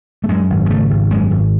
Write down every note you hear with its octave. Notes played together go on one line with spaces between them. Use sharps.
A3
F#2 G#3
G#1
G#3
C#3 A3
G#1
F#2 G#3
G#1